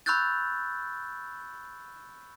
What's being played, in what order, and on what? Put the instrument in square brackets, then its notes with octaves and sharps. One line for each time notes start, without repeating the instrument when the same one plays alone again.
[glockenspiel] B5 C#6 E6 F#6 G6 A6